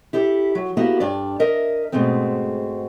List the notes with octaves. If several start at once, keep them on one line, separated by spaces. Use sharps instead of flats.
E4 G4 A4
F#3
A#3 B3 E4 F#4 G4 A4
G2 D4 D5
A#4 D#5 E5
G#2 B2 G#3 A3 C4